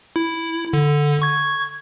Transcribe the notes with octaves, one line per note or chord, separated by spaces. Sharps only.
E4
D3
C#6 G#6